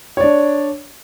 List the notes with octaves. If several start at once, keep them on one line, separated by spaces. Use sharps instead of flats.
D4 C#5 D5